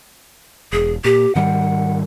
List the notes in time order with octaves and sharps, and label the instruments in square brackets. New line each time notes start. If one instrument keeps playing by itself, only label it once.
[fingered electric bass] E1 [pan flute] G#4
[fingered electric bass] A#2 [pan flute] G4
[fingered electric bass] G#2 D#3 G3 [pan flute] F#5